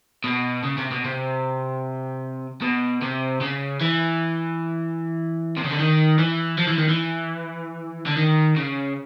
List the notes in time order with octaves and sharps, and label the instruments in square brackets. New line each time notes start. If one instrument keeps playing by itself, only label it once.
[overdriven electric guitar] B2
C#3
C3
B2
C3
B2
C3
C#3
E3
C3
C#3
D3
D#3
E3
F3
E3
D#3
E3
D3
D#3
C#3